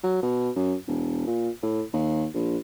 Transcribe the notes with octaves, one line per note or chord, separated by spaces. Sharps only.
F#3
B2
F#2
E1
A#2
A2
D#2
A#1